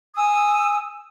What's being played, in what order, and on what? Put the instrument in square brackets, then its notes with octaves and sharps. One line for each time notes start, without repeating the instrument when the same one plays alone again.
[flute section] G#5 D#6 E6